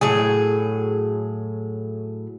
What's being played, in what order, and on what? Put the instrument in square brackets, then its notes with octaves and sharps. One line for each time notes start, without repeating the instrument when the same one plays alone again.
[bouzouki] A2 F#3 G#4